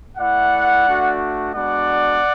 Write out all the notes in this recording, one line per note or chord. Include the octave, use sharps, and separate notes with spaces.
A3 E4 D5 F#5
A3 D4 F#4
G#3 B3 D4 F#4 D5 F#5